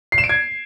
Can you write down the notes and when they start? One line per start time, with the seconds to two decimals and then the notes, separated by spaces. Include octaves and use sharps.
0.12 C7
0.18 E7
0.24 D7
0.29 G#6